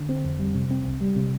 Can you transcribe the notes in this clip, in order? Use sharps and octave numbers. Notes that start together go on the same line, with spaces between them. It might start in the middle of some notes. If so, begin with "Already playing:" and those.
Already playing: D3
C4
F2
G3
C3
C4
C2
G3
C3